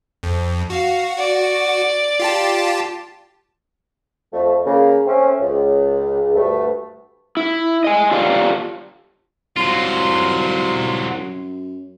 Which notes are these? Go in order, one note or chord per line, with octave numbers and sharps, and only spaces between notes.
F2
F#4 F5
D5
F4 G4 A5
F2 A3
C#3 A#3
A3 C4 C#4
C#2
D2 G2 A3
E4
D#5 G#5
F4 G4 A4 D5 F5
C2 F#3 F4 C6
F#2